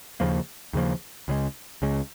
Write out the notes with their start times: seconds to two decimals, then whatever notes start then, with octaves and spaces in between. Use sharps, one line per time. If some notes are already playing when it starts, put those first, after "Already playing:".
0.20 D#2 C#3 F3 A#3
0.73 D#2 C#3 F3 A#3
1.28 C#2 C#3 G#3
1.82 C#2 C#3 G#3